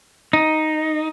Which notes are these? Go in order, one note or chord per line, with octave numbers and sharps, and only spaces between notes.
D#4